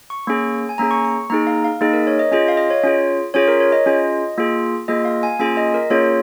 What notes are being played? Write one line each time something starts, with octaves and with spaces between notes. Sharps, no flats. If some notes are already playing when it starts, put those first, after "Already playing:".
C#6
A#3 C#4 G#4
G#5
A#3 C#4 G#4 A#5
C#6
C#6
A#3 D#4 G#4 A#5
F5
F5
A#3 D#4 G#4 D#5
A#4
C#5
D#5
C#4 F4 G#4 D#5
F5
D#5
C#5
C#4 F4 G#4
C#4 F4 G#4 C#5
A#4
C#5
D#5
C#4 F4 G#4
A#3 F4 G#4
A#3 F4 G#4 D#5
F5
G#5
A#3 C#4 F4 G#4 G#5
D#5
A#4
A#3 C#4 F4 G#4 C#5